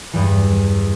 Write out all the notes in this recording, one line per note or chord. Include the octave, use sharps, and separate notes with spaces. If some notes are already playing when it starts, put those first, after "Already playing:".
E2 G2 E3